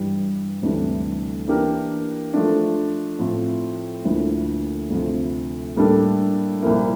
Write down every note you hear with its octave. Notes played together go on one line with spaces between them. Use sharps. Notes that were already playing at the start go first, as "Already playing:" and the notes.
Already playing: G2 E3 G3
D2 C3 E3 G3 D4
E3 A#3 D4 G4 A#4
F3 A3 D4
A2 F3 C4 E4
D2 D3 F3 A#3 E4
D2 C3 F3
A2 G3 A#3 D4 A4
C2 A#2 F3 A#3 E4